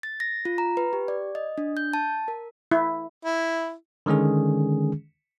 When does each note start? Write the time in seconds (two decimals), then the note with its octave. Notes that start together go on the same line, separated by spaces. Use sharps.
0.03 A6
0.20 A#6
0.45 F4
0.58 A#5
0.77 B4
0.93 G4
1.08 D5
1.35 D#5
1.58 D4
1.77 G6
1.93 A5
2.28 A#4
2.71 E4
3.25 E4
4.06 D3 D#3 G#3 C#4 G#4